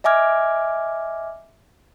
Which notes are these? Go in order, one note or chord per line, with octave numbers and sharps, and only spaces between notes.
D#5 E5 G#5 D6 F6 G#6